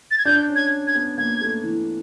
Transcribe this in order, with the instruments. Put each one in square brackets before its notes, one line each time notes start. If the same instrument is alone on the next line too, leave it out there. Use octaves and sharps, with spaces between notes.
[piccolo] A6
G#6
[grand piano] D4 [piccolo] G6
[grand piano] C#4
[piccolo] G#6
G#6
[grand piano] B3
[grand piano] A#3 [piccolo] G#6
[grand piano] A3
E3